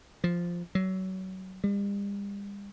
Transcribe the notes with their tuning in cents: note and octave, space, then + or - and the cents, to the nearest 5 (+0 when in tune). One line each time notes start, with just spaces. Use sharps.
F3 -5
F#3 +25
G3 +40